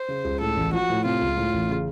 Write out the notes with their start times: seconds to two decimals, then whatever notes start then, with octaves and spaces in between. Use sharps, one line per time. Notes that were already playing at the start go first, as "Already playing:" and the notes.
Already playing: C5
0.08 C#3
0.24 C#2
0.40 A2 A4
0.57 A1
0.73 F3 F#4
0.90 A2
1.05 C3 F4
1.21 C#2
1.37 A2
1.54 A1
1.69 C#3